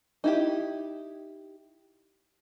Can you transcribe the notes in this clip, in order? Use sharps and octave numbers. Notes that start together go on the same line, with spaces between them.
D#4 E4 G4